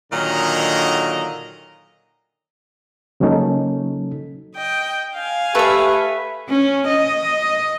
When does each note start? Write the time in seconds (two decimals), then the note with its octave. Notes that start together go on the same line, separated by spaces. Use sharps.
0.13 A#2 D3 D#3 F#3 D#5 A#5
3.20 C#3 F#3 A#3 C#4 D#4 A4
4.56 D#5 G5
5.16 F5 G#5
5.55 A3 G4 B4 E5
6.49 C#4
6.87 D#5